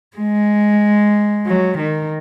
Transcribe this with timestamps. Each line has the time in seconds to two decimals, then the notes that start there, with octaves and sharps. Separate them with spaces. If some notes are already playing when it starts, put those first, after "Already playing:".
0.17 G#3
1.46 F#3
1.78 D#3